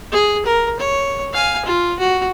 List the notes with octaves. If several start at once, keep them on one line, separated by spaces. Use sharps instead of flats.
G#4
A#4
C#5
F5 G#5
F4
F#4